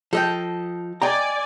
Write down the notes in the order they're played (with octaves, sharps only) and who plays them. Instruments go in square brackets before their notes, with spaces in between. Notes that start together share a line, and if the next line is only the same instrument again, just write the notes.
[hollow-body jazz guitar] F3 [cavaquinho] A4 D#5 G5
[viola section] D5 G#5 [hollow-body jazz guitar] D#5 G5 A#5